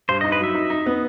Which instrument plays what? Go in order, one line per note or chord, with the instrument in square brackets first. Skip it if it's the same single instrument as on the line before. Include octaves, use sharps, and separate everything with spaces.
[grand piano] G2 [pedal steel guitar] C5
[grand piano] D#4 [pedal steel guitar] D#5
[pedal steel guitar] B4
[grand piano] F#3 [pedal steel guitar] E5
[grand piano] D#4
D#4
B3